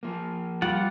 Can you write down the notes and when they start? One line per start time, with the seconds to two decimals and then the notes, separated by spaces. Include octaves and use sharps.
0.03 F3 A#3
0.62 G3 F4 F#5